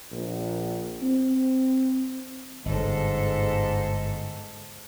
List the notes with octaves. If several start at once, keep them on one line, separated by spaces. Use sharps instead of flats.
A#1
C4
G1 G#2 A4